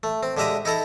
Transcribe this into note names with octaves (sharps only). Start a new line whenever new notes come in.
A3
C4
D3 G#3 G4 E5 A#5 D#6
D#4 E4 A4 A#5